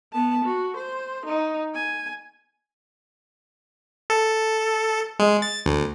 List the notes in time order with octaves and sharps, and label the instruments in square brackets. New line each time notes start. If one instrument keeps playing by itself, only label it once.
[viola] B3 A5
F#4
C5 C6
D#4
G#5
[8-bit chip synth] A4
G#3
A6
D2